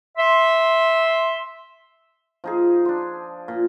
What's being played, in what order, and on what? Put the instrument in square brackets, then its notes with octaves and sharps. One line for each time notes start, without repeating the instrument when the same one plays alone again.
[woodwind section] E5 C6
[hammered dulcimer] F3 D#4 G#4
D4 C6
A#2